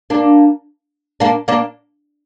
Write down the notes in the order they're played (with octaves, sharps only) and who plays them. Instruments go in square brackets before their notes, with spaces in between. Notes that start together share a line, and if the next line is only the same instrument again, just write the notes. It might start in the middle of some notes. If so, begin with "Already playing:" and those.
[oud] A#3 D4
A#3 D4
A#3 D4